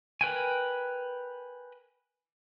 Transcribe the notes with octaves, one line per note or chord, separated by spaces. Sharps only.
A#4 B4 G5 G#5